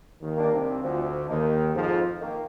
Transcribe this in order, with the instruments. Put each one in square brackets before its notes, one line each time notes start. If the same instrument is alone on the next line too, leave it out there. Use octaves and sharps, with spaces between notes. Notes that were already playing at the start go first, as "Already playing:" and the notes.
[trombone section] D#2 D#3
[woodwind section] A#3 D4
[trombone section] C2 C3
[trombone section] D2 D3 [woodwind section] F3
[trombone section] D#2 D#3 [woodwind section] A#3 D#4
[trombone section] F2 F3 [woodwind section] G#2
[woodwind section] D#3 A#3